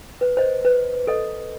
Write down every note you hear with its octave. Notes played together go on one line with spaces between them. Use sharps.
B4
C5 D#5
B4
A4 D#5